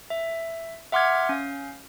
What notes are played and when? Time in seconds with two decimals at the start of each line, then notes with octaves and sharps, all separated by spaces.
0.10 E5
0.92 E5 F#5 C6 D6 F6 G#6
1.29 C#4 F5